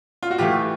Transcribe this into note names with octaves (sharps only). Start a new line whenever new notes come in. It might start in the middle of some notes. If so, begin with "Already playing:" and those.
F4
F#4
A2 E3 A3 F4 G4